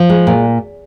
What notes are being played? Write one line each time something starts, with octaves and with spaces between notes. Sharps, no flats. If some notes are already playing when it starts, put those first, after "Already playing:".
Already playing: F3
G#3
A#2